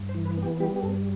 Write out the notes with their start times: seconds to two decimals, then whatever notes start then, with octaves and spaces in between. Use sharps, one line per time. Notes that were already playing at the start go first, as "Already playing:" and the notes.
Already playing: G2
0.09 C5
0.14 E3
0.25 B4
0.37 B3
0.43 G4
0.60 G3 G4
0.76 G4
0.82 G2 A4